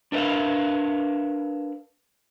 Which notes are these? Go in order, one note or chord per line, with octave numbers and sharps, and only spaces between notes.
D4 A#4 B4 E5 F5